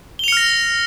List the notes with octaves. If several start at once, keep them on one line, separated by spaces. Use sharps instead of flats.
F6 A#6 C#7 F7 G7